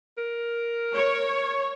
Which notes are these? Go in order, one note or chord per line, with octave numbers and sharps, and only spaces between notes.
A#4
C#5